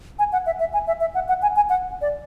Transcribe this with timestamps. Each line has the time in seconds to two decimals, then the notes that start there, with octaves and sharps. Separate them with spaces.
0.19 G#5
0.32 F#5
0.46 E5
0.60 E5
0.73 G#5
0.87 E5
1.01 E5
1.14 F#5
1.28 F#5
1.42 G#5
1.56 G#5
1.69 F#5
2.01 D5